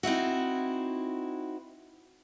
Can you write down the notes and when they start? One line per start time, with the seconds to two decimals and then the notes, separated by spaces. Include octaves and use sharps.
0.03 C4 D#4 E4 F#4